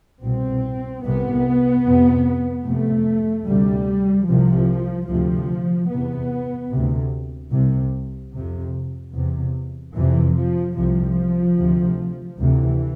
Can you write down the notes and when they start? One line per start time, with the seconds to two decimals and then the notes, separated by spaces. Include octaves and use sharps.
0.22 C2 B2 C4
1.03 C2 C3 B3
1.84 F2 C3
2.65 F2 C3 A3
3.46 D2 C3 G3
4.27 C2 C3 F3
5.08 D2 C3 F3
5.89 E2 C3 B3
6.71 D2 C3
7.52 C2 C3
8.33 F2 C3
9.13 E2 C3
9.95 F2 C3 E3
10.35 F3
10.76 C2 C3 F3
11.57 D2 C3
12.39 D2 C3 E3